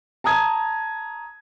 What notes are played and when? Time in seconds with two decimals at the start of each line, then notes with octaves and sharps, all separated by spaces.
0.24 A5 A#5 D#6 G#6